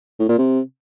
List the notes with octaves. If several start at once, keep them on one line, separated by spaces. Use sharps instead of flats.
A2
A#2
C3